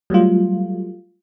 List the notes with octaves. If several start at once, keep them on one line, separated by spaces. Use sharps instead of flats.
F#3 G3 A3 F4